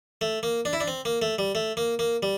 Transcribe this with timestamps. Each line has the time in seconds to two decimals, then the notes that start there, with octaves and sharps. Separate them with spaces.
0.21 A3
0.43 A#3
0.65 D4
0.73 E4
0.80 D4
0.88 C4
1.05 A#3
1.22 A3
1.39 G3
1.55 A3
1.77 A#3
1.99 A#3
2.23 G3